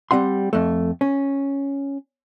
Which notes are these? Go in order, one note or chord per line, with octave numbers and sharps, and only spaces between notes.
G3 C4 F#5 C6
F2 A3
C#4